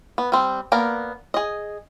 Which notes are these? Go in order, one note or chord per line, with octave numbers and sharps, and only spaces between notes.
B3
G3 C4
A#3 B3 A#4 D5
G#4 D#5